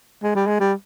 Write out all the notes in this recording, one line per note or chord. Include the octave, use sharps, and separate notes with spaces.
G#3
G3
G#3
G3